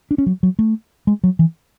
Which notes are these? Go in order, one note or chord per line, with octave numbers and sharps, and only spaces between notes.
D4
C#4
F#3
F#3
A3
G#3
F#3
E3